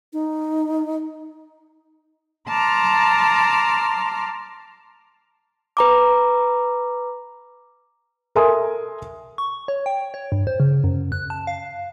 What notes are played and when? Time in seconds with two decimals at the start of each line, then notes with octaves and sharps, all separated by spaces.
0.13 D#4
2.49 A5 A#5 C6 D6 F6
5.77 B4 A#5 D6
8.35 A4 A#4 E5 G#5 C6 D#6
9.38 C#6
9.68 C#5
9.86 G5
10.14 C#5
10.32 G2
10.47 C5
10.60 C#3
10.84 F#2
11.12 F#6
11.30 A5
11.47 F5